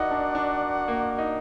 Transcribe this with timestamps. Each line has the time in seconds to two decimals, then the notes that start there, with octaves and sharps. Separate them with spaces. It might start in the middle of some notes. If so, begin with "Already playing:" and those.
Already playing: D#4 E4 F#4 A#4 D5 F#5
0.11 D4
0.35 D4
0.88 A#3
1.19 D#4